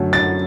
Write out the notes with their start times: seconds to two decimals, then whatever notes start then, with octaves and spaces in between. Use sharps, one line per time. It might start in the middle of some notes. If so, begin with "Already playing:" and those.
Already playing: F#2 D3 F#3 A3
0.13 A6